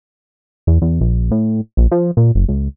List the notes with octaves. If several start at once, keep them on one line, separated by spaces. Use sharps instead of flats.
E2
E2
A#1
A2
A#1
F3
A#2
F#1
C#2